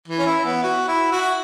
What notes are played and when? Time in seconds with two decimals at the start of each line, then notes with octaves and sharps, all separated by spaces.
0.08 E3
0.19 C#4
0.26 E4
0.45 B3
0.63 F#4
0.88 E4
1.12 F#4